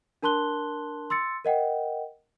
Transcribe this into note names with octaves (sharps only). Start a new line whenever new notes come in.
D4 A#4 A5 C6 F#6 G7
C6 E6 A6 C#7
A#4 D#5 F#5 G5